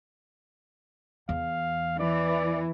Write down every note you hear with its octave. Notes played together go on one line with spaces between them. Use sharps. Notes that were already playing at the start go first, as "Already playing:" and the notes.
E2 F5
E3 D5